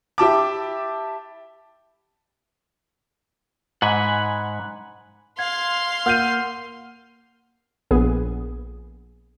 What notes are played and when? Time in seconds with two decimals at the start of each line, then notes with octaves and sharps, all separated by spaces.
0.18 E4 G4 A5 D6
3.82 G#2 F#5 G#5 B5
5.39 F5 C6 G#6
6.06 A#3 F#5 F6 G6 D#7
7.91 A#1 B3 G#4